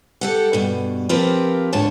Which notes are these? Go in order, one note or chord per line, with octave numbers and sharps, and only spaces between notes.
G4 A4 F#5
G2 B2
F3 C4 F4 G4 A#4 B4
D2 G#2 D3 C#5 A5